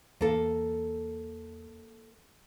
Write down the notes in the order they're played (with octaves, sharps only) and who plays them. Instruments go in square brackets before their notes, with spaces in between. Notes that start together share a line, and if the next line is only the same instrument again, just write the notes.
[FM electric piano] E2 [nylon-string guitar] A#3 A4